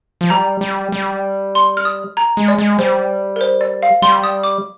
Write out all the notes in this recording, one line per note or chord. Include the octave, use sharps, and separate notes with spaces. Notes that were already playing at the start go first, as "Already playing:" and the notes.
F3
G3 A#5
G3
G3
C6
F6
D#6
A#5
G#3
D5
G#3
G3 C5
A#4
C5
D5
F5
G3 C6
D#6
D6